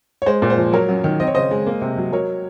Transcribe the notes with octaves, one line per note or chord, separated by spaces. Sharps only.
C#5
G#3 C5
A#2
C5
F3
F#3 A#4 C#5
F#2
D#3
C4 D#5
C#5
C#3 C5 D#5
G#3
A#3
C3
F#3
F#3 A#4 C#5